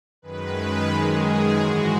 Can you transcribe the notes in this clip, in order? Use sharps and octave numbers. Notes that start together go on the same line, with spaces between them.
F#2 D#3 G#3 B4
G#4
G#2 E3 G#3 F#4